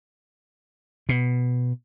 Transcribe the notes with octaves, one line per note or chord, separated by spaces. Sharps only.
B2